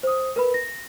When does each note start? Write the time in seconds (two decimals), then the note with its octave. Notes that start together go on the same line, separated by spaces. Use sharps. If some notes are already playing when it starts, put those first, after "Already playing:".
0.03 C5 D#6
0.36 A#4 B4 B5
0.54 A#6